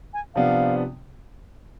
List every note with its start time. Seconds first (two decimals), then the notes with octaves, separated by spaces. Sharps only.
0.14 G#5
0.35 C3 F3 B3 D4 F5